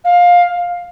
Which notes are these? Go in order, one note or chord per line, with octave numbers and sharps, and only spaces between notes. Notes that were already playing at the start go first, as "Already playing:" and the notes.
F5